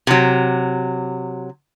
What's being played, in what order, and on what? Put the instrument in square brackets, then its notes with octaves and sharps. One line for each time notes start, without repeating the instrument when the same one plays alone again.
[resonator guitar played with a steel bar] C3 F#3